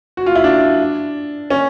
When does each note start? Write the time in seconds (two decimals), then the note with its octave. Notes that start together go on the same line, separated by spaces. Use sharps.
0.17 F#4
0.26 F4
0.35 E4
0.44 D4
1.50 C#4